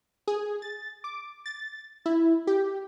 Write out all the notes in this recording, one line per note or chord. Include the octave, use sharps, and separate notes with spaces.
G#4
A6
D6
A6
E4
G4